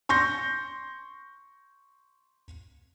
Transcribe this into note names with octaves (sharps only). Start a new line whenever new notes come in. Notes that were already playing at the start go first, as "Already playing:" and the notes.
C6 C#6 G6 A#6